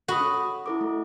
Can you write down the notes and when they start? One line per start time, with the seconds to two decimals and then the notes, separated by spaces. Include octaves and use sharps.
0.08 F#4 A4 B5 D#6
0.20 C#4
0.66 E4 A4 D6
0.81 A3